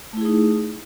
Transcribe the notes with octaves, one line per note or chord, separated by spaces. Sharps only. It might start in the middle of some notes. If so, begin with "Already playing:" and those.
A3 D#4 E4 G#4